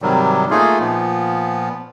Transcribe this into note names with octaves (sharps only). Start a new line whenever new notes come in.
G#2 C3 D#3 F#3 G3
A3 A#3 D#4 F4 G#4
A#2 F3 B3